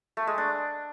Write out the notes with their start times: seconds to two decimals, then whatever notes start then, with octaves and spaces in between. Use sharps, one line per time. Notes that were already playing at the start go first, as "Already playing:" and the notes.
0.17 A3
0.27 G#3
0.38 D4